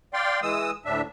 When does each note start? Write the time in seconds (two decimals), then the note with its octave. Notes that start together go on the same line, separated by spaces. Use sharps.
0.14 D5 F5 G5 C6
0.42 E3 G#3 D#6 E6
0.85 D2 A2 D4 E5